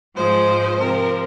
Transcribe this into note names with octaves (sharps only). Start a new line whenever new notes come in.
G#2 F3 G#3 C5
C3 F3 C4 A#4